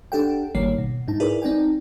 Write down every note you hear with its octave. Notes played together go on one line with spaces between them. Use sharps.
D4 G4 A4 F#5 G5
G#1 D#3 G3 A#3 C#5 C7
B2
G#2 D#4 A5
E4 G#4 A#4 B4 D5
C4 D#4 D5 G5 G#5